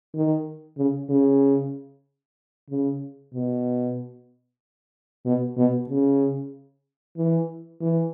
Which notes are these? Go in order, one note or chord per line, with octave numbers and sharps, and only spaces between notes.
D#3
C#3
C#3
C#3
B2
B2
B2
C#3
E3
E3